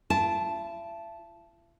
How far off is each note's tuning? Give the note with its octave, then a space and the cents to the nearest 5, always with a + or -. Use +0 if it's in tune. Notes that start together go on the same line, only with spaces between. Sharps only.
E4 +40 A5 -10